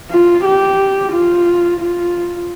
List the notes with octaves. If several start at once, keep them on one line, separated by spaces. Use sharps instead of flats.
F4
G4
F4
F4